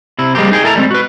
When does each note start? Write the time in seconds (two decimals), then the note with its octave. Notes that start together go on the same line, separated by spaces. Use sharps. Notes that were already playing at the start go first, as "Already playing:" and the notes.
0.19 C3 E4
0.35 G3 G#3 A#3 C4 G4
0.51 D#4 G#4 G5
0.64 E4 A4 A#4 G#5 A#5
0.76 G3 G#3 C4
0.91 F#4 B4